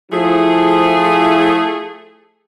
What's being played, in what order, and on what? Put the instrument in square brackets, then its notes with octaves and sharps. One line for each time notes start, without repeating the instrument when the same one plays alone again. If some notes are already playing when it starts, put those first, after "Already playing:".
[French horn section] F3 E4 [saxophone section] A3 G#4